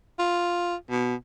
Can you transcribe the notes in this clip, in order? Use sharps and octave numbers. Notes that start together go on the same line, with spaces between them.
F4
B2